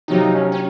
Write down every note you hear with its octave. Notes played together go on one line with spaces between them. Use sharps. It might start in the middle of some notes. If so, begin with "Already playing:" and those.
C3 D#3 F#3 A#3 D#4
C#4
C#4